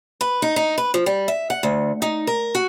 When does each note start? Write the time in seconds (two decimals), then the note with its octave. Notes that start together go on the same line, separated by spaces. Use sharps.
0.21 B4
0.42 D#4
0.56 D#4
0.78 B4
0.94 F3
1.06 G3
1.28 E5
1.50 F#5
1.63 D2
2.02 D#4
2.27 A#4
2.55 F#4